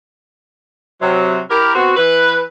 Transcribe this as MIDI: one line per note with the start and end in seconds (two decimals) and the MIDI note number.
1.01 1.40 48
1.01 1.40 54
1.50 1.74 64
1.50 1.74 67
1.50 1.74 70
1.75 1.92 59
1.75 1.92 60
1.75 1.92 66
1.97 2.41 52
1.97 2.41 71